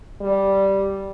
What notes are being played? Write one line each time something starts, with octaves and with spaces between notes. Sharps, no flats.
G3